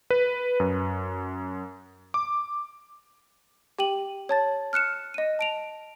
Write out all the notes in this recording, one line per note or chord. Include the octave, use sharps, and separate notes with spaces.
B4
F#2
D6
G4 G5 D#7 F#7
C#5 A5 A6
F6 F#6 C#7 E7
D#5 D#7
A5 D7 F7